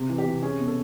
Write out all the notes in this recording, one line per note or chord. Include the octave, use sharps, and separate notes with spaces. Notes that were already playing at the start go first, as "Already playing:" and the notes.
Already playing: C3
E3
G4
C3
C#4 G#4
B2
A4